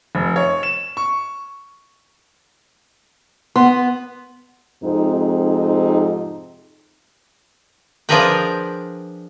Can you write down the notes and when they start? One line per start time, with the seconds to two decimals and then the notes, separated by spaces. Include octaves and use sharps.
0.15 F1
0.36 C#5
0.63 E7
0.97 C#6
3.56 B3 C6
4.84 F2 G#2 C3 C4 D#4
8.09 F3 D4 G#4 A#4 B4 G5